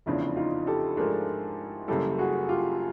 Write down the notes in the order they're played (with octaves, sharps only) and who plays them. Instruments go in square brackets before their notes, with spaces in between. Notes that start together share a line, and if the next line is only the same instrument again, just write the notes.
[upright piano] F1 E2 C#3 F3 [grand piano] D4 E4
[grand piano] D#4 F4
G4 A4
[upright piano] G#2 F3 A3 D4 [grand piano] G#4 A#4
[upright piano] F#1 F#2 C#3 E3 G3 [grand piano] G4 A4
[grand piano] F#4 G#4
F4 G4